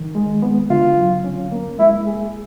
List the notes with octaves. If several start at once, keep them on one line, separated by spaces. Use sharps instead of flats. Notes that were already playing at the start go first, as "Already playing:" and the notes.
Already playing: D#3
G#3
B3
D3 F4
F#3
C#4
A#3
G#3 E4
G#4